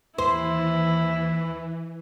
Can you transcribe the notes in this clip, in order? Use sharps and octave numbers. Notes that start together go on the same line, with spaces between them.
D#2 E3 E4 C5